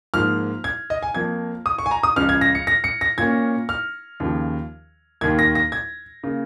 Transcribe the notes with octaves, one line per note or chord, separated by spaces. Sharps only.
G#2 F3 A#3 F6
G#6
D#5
G#5
F2 F3 A#3 G#6
D#6
C#6
G#5
A#5
D#6
C#2 C#3 F3 F6
G#6
A#6
C#7
A#6
C#7
A#6
A#2 A#3 C#4 G#6
F6
D#2 C#3 F3
D#2 D#3 A#3 G#6
A#6
A#6
G#6
C#3 A#3